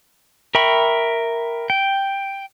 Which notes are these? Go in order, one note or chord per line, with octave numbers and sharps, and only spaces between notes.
A#4 E5 G5 B5 C#6
G5